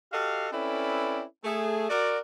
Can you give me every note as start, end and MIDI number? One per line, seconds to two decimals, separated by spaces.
0.12 0.47 66
0.12 0.47 67
0.12 0.47 69
0.12 0.47 75
0.12 0.47 77
0.52 1.23 60
0.52 1.23 61
0.52 1.23 64
0.52 1.23 69
0.52 1.23 71
0.52 1.23 74
1.44 1.87 57
1.44 1.87 68
1.90 2.18 66
1.90 2.18 70
1.90 2.18 74